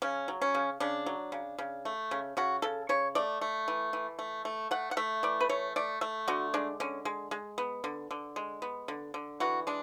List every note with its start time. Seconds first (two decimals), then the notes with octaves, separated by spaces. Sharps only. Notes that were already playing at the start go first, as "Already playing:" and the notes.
0.02 C#3 C#4
0.28 F#3
0.42 C#4
0.55 C#3
0.80 C#3 D4
1.06 F#3
1.32 C#3
1.58 C#3
1.85 A3
2.11 C#3
2.37 C#3 F#4
2.62 C#3 A4
2.89 C#3 C#5
3.15 A3 D5
3.41 A3
3.68 E3
3.93 E3
4.19 A3
4.45 A3
4.71 A3 F#5
4.91 F#5
4.97 A3 E5
5.23 E3 D5
5.40 B4
5.49 A3 C#5
5.76 A3 D5
6.01 A3 E5
6.28 D3 F#4
6.54 G#3 D4
6.80 D3 C#4
7.05 G#3
7.31 G#3
7.58 B3
7.84 D3
8.11 D3
8.36 G#3
8.62 B3
8.88 D3
9.14 D3
9.40 E3 F#4
9.67 G#3 D4